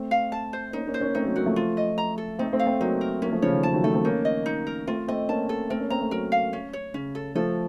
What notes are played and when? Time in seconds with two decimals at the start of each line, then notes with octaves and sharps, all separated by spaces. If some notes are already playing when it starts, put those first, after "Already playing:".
Already playing: A3 C4
0.11 F5
0.32 A5
0.53 C5
0.73 A#3 C#4 D#4
0.87 A#3 C#4
0.94 C5
1.01 A#3 C#4
1.15 A3 C4 D#4
1.25 F#3 A#3
1.35 F#3 A#3 F#4
1.46 F3 A3
1.56 F4
1.77 D#5
1.98 A#5
2.18 A4
2.39 A3 C4 D#4
2.53 A3 C4
2.59 F5
2.66 A3 C4
2.80 F#3 A#3 D#4
3.01 A#4
3.22 F#3 A#3 C#4
3.32 F3 A3
3.42 C#3 F3 C#5
3.53 D#3
3.63 C#3 F3 A5
3.73 D#3 F#3
3.84 F3 A3 A4
3.94 A3 C4
4.04 A#3 C#4 D#4
4.25 D#5
4.46 D#4
4.67 A#4
4.87 A3 C4 F4
5.08 A3 C4 D#5
5.28 A#3 C#4 A5
5.49 A4
5.70 A3 C4 A#4
5.80 A#3 C#4
5.90 A3 C4 A#5
6.01 A3 C4
6.11 F#3 A#3 A#4
6.32 F5
6.53 C#4
6.73 C#5
6.94 C#3 C#4
7.15 A4
7.35 F3 A3 A4